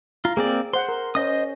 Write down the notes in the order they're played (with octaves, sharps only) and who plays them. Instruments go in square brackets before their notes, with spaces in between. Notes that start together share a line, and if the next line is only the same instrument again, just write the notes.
[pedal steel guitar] F4 [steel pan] A#5
[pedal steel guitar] A#3 C4 D5 [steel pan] G#4
[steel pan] C5 F#5 [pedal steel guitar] C6
[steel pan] A#4
[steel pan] C#4 [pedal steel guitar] C5 D#5 D#6